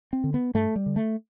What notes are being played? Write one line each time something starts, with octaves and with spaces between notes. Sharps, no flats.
C4
D3
B3
G2 A3
G3
D3
A3